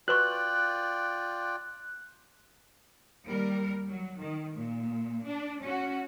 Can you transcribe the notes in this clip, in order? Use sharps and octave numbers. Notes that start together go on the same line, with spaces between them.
F4 F#4 B4 D5 G5 C#6 F#6
D#2 G3 A#4
F#3
D#3
A#2
D4
C#4 F#4